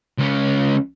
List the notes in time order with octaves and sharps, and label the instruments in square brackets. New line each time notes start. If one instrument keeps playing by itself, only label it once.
[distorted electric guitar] C#2 C#4